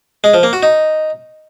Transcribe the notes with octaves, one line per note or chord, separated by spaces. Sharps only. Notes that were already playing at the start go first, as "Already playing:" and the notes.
G#3
F3
A#3
F#4
D#4